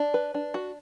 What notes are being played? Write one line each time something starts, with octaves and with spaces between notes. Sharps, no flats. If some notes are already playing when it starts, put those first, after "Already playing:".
Already playing: D4
B4
D4
F#4